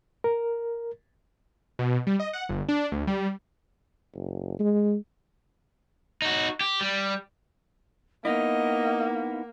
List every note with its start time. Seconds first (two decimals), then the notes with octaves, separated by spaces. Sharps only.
0.24 A#4
1.79 B2
2.07 G3
2.20 D#5
2.33 F#5
2.49 G1
2.68 D4
2.92 D2
3.07 G3
4.14 F#1
4.59 G#3
6.22 D#4 F#4
6.61 G4
6.81 G3
8.25 A#3 B3 D#4 E4 D#5 F#5